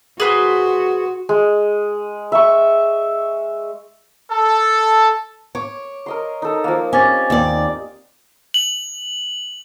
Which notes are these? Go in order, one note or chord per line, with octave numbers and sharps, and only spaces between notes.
F#4 G#4 B4 C5
G#3
E5 C#6
A4
C#5 D6
A#4 D#5 C6
D#4 A4
F3 A#3
C4 C#4 G4 G#5 D6 A6
D#2 D5
F#7